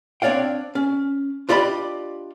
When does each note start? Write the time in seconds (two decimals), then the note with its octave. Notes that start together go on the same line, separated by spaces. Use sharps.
0.22 C4 D4 C#5 D5 F5 G5
0.75 C#4
1.49 D4 F4 G4 D5 D#5 B5